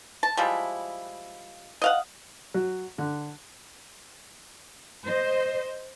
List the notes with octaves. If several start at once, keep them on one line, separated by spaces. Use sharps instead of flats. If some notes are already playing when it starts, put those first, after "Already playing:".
A5
F3 G3 G#3 E4
D#5 F5 F#5
F#3
D3
C5 D#5